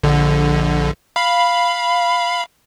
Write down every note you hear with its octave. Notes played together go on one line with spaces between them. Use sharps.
A#1 D3
F5 B5